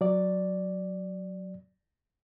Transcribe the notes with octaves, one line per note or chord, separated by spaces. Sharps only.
F#3 D5